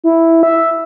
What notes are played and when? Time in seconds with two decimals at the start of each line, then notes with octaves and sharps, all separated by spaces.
0.04 E4
0.43 E5